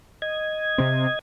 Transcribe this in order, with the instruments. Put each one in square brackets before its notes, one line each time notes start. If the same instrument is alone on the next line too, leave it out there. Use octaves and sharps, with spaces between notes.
[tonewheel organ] D#5 G#6
[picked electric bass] C3 C4